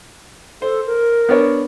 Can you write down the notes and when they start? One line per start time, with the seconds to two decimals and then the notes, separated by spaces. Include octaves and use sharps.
0.62 A4 C5
0.87 A#4
1.29 B3 D4 C#5